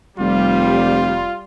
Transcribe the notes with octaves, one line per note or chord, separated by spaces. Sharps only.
F1 G3 F4